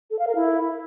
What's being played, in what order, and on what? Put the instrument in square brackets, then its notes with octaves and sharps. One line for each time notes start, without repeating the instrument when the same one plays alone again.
[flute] A4
F5
A#4
E4